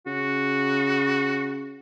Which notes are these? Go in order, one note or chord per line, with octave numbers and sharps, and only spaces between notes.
C#3 F#4